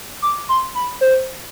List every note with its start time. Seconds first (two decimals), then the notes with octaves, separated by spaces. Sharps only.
0.22 D6
0.49 C6
0.75 B5
1.01 C5